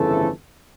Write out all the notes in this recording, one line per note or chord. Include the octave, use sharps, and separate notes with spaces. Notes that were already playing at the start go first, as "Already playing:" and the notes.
Already playing: G1 F2 C#3 E3 A3 A4